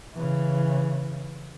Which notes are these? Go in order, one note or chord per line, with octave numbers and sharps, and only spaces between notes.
C#3 E3